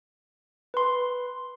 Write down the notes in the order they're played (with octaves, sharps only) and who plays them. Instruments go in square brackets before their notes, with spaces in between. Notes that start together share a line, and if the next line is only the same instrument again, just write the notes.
[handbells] B4 C6